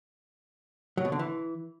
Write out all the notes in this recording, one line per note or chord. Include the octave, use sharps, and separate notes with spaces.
F#3
B2
D3
E3